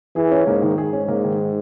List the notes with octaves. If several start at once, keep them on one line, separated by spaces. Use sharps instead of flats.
E3 G#4
C#4
G#2 A#3
D#3
G#2 G#4
C#4
A#3
D#3